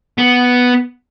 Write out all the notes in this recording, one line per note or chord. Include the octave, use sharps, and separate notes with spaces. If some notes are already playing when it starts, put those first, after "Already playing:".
B3